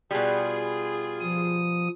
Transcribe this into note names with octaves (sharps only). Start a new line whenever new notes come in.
B2 G3 F4 G#4
F3 D#6